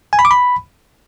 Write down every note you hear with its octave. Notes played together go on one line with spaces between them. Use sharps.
G#5
B5
D6
B5